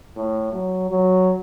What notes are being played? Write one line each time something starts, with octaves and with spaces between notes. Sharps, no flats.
A2
F#3
F#3